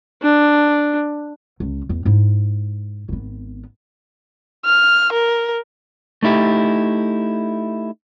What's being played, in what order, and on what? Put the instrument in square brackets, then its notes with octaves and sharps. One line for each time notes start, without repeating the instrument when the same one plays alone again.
[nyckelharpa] D4
[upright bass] C#2
E2
G#2 E4
G#1 B3
[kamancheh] F6
A#4
[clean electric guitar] A3 D#4 E4 G4